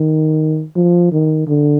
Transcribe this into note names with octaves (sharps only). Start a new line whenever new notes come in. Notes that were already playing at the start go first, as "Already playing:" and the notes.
Already playing: D#3
F3
D#3
D3